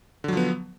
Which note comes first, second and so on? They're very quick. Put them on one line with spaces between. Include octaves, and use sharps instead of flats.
D3 F#3 F3 B3